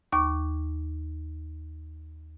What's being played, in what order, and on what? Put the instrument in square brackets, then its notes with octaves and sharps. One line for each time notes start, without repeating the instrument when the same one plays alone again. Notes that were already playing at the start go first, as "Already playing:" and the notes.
[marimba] D#2 C#6 D6